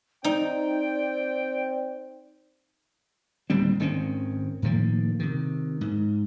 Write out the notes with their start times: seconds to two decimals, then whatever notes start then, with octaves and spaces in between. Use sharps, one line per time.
0.24 C4 D#4 D5 G5
3.50 D1 D#2 G3 C4
3.80 G#1 D#3 C4 C#4
4.62 A2 D#3 F3 A#3
5.20 C3 D#3
5.81 G#2